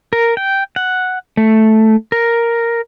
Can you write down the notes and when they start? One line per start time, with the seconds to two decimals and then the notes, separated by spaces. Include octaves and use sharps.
0.13 A#4
0.37 G5
0.76 F#5
1.37 A3
2.12 A#4